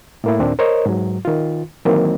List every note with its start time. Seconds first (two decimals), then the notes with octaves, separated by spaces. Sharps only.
0.24 A2 A#3 E4
0.39 D#2 A#2 C4 D4
0.59 A#4 C5 C#5 D#5
0.86 G#2 F#3
1.25 D#3 F4
1.85 D#3 E3 F#3 A#3 C4